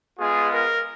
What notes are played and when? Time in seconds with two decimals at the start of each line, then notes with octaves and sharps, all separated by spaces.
0.18 G#3 B3 F4 G#4
0.53 A#4